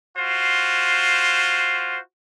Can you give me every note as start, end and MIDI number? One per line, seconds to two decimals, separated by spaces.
0.16 1.98 65
0.16 1.98 66
0.16 1.98 72